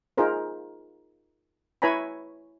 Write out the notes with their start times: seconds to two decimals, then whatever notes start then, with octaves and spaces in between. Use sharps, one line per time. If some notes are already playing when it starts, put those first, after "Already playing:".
0.17 D#4 F4 G#4 A#4 C5
1.82 E4 B4 C#5 G#5 A#5 B5